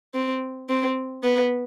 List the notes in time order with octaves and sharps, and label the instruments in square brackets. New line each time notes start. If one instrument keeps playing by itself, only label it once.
[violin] C4
C4
B3